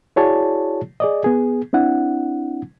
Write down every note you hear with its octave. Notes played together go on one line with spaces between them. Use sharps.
E4 F#4 G#4 C#5 D5 A5
G#4 D5 D#5
B3 G#4
C4 D4 E4 F#5